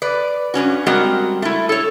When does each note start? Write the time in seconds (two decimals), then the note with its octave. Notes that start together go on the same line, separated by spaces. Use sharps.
0.02 B4 D5
0.54 G2 A#2 C#4 F#4
0.86 G3 G#3 C4 F#4 A#4 F#5
1.42 A3 E4
1.69 A4 C#5